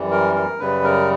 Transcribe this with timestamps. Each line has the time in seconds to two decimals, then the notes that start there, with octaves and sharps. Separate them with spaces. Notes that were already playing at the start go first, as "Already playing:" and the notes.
Already playing: F#2 E3 G3
0.11 A#4
0.35 A#4
0.59 F#2 C#3 G3 B4
0.84 A#4